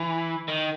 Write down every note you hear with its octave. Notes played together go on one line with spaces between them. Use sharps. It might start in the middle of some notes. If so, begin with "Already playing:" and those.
Already playing: E3
D#3